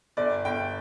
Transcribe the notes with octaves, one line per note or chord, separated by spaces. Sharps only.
G1 D5
G1 G5